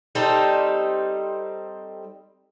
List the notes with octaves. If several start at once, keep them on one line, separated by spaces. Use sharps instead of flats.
G3 C4 D#4 A4